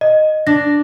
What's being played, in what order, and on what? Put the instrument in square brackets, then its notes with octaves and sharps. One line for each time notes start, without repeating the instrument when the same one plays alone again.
[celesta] D#5
[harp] D4 [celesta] A#6